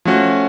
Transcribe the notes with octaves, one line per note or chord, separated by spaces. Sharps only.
F3 A3 C#4 F#4